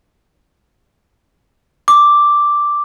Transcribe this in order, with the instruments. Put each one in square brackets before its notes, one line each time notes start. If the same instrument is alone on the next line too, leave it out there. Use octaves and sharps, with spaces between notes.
[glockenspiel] D6